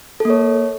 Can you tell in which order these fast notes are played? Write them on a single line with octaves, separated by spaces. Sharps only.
A4 A#3 C#5